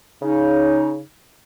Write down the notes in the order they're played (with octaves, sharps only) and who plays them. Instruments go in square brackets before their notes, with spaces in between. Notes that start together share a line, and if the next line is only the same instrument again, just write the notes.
[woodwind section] C#3 D#4